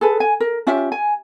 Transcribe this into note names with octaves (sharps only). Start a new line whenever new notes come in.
G#4 A4 B4
G#5
A#4
C#4 F4 G4 E5
G#5